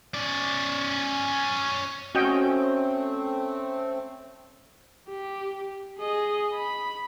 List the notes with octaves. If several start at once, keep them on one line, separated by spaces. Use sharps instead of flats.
C#4 D5
A3 C4 C#4 F#4 D#5 G5
G4
G#4 D#5
B5